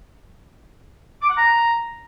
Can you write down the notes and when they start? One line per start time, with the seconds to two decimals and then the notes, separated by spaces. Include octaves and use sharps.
1.22 D6
1.30 F#5
1.38 A#5